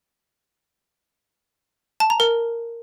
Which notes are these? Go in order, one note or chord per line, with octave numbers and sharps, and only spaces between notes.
A5
A#5
A#4